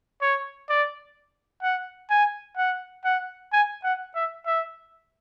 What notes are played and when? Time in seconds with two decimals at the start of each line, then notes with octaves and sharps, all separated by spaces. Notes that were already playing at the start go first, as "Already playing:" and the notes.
0.22 C#5
0.69 D5
1.62 F#5
2.10 G#5
2.57 F#5
3.04 F#5
3.52 G#5
3.84 F#5
4.15 E5
4.46 E5